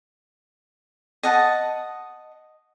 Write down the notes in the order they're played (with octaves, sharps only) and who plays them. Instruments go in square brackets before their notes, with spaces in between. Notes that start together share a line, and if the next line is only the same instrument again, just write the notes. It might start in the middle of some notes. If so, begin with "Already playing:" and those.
[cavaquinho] D#5 F#5 A5